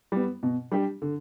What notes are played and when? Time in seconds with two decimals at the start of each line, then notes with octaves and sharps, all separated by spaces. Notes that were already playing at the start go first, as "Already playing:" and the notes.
0.12 G3 B3
0.43 B2
0.71 G3 D4 G4
1.02 D3